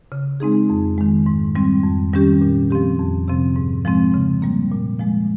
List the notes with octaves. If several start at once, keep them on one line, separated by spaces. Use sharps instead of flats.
C#3
G#3 C4 D#4 G#4
F2
D#3 G#3
G#2
G3 C4
F2
D#3 G3 C#4 G4
A#2
F3 C4 G4
F2
C3 F3 C4
G#2
F3 G#3 C4
C#3
G3 A#3
A#2
F3 G#3